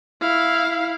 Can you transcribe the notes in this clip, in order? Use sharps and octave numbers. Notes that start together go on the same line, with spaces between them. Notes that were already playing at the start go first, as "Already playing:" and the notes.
E4 F5